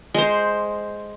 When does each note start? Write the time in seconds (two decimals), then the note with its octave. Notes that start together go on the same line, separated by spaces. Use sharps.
0.14 G#3 C5